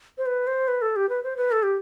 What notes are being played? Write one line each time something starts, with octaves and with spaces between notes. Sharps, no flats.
C5
B4
C5
B4
A4
G4
B4
C5
B4
A4
G4